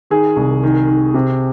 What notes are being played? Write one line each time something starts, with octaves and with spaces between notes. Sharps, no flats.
D#3 G#4
C2
D#3
D#3
C3